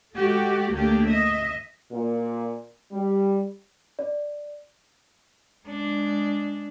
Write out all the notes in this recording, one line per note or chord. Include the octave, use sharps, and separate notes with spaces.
G#3 F#4 G4 A4
D2 A3 A#3 D4 G4
D#5 E5
A#2
G3
D5
G#3 D4